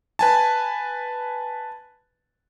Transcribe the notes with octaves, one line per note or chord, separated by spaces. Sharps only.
B4 G#5 A5